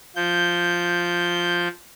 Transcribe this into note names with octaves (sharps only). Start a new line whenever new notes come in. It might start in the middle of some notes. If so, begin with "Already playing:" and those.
F3 G6